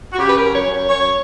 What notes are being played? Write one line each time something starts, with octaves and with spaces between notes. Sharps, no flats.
F#4
C#3 G4
B4
A#4
F#2
C#5
F#2
C#5
F#2 C#5